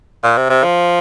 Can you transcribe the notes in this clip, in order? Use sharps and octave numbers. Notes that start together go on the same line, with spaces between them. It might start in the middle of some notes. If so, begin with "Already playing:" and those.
A#2
C3
C3
F3